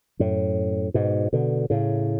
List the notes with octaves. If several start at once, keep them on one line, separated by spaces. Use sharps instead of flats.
F#2 A2
G#2 B2
B2 D3
A2 C#3